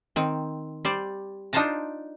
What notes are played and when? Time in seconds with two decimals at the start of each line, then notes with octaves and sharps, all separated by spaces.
0.16 D#3 C4
0.85 G3 C5 D5
1.53 D4 D#4 F4 C5 A5 A#5